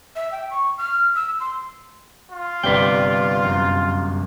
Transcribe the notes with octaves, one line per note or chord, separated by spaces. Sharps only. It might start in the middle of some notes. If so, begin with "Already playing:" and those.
E5
G5
C#6
F6
E6
C6
F4
G1 C3 B4 D5 G5
F#2